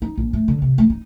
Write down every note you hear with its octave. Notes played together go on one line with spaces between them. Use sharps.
D#4
A#1
A3
D3
C3
A3
D#4